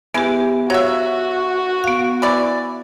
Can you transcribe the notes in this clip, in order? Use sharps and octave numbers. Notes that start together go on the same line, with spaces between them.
E3 G#3 B3 G4
F#3 F#4 C#5 E5 F5
B3 F5
E3 E4 D5